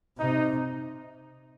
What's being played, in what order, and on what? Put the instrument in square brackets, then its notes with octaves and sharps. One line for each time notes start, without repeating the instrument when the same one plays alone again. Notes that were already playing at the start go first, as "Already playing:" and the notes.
[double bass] C3 [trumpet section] D#4